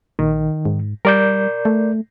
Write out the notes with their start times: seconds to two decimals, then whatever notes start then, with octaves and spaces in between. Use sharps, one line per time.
0.19 A#1 D#3
0.65 G#2
1.05 G3 A#4 D5 G6
1.65 A3